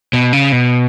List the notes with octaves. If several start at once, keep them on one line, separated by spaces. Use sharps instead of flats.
B2
C#3
B2